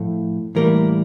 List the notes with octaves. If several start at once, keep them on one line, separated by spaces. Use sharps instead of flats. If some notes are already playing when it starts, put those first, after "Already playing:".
Already playing: A2 F3 A3
A2 E3 G3 A#3 A#4